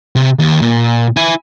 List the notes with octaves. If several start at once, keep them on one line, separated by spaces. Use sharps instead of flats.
C3
D#2
A#2
E4 G#5